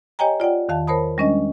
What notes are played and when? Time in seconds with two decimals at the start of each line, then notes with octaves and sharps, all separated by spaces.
0.19 G4 C#5 D#5 G5 G#5 A#5
0.40 F4 D5 F#5 G5
0.69 E2 D#3 F5 A5
0.87 A#4 C5 C#5 A5 B5 D#6
1.18 G3 G#3 C#4 D4 D#5